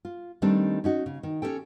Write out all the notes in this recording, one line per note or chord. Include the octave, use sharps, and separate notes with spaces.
F4
D#3 G3 A3 C4 D4
C#4 D#4 F#4
C#3
D#3
C#4 G4 A4 G5